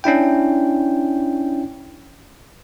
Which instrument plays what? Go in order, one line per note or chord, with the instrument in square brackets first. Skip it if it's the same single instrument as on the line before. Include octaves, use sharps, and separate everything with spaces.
[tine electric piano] C#4 D4 E4 G5